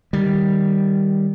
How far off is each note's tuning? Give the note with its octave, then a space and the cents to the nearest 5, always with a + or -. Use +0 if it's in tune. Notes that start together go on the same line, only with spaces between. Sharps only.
D#3 +0 G3 +0